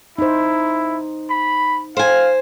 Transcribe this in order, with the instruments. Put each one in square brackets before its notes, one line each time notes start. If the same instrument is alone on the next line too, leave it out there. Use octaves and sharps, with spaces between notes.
[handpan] D#4 C5 [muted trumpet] E4
[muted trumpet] B5
[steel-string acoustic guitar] C5 G#5 [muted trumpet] F5